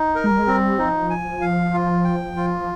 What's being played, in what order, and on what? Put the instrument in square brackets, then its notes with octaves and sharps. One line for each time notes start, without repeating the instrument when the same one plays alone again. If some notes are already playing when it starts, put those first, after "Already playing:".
Already playing: [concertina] D#4
A#4
[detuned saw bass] G#3
G3
G#3
[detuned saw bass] G3 [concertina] C4
[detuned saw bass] F3 [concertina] D#4
[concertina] G#5
F5
F4
G5
F4